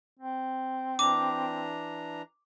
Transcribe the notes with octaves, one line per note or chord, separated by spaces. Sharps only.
C4
E3 D4 A#5 D6